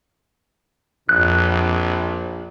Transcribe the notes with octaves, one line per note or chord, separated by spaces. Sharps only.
A#1 F2 F#6